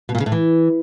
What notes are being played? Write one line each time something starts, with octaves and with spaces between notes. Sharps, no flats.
B2
A#2
C#3
A2
E3